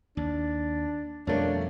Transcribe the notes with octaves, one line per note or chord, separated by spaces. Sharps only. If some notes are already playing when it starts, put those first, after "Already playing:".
D#2 D4
F2 B2 G3 A3 A#3 C#4 D4